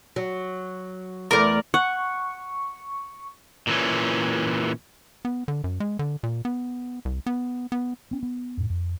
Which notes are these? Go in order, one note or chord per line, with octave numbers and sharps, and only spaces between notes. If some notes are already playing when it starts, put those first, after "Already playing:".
F#3
E2 A3 A#4 D5
F#5 C#6
A#2 E3 C#4
B3
D3
F#2
G#3
D3
A#2
B3
C2
B3
B3
B3 C#4
B3
F2 A2
F2